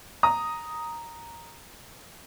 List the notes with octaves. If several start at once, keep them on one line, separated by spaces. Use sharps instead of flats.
A#5 D#6